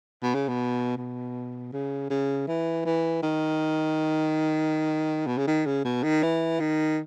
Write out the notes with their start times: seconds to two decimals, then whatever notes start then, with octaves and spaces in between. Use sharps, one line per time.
0.23 B2
0.35 C#3
0.49 B2
0.97 B2
1.72 C#3
2.10 C#3
2.47 E3
2.85 E3
3.23 D#3
5.27 B2
5.38 C#3
5.47 D#3
5.66 C#3
5.85 B2
6.03 D#3
6.23 E3
6.60 D#3